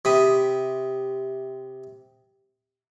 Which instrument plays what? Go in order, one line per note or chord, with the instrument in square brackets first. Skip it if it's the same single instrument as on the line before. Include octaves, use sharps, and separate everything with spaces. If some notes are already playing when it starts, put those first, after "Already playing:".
[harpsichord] C3 B5 D#6